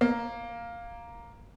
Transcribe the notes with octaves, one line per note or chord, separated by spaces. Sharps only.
A#3